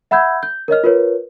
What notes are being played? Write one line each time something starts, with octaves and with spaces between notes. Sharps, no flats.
E5 F#5 B5 E6 G6 G#6
G6
A#4 C#5 D#5 F6
F4 A#4 B4 C#5